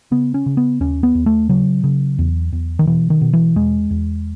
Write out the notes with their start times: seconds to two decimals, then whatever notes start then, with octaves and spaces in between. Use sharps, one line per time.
0.11 C#3 B3
0.34 C#4
0.46 C#3
0.57 B3
0.80 D#2 C#4
1.03 B3
1.15 D#2
1.26 A3
1.49 C#3 F#3
1.84 C#3
2.19 E2
2.53 E2
2.79 D#3
2.87 B2 E3
3.10 D#3
3.21 B2
3.33 E3
3.56 E2 G#3
3.91 E2